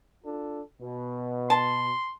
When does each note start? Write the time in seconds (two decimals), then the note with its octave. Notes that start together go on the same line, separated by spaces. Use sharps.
0.24 D4 F4 A4
0.80 B2
1.50 A5 C6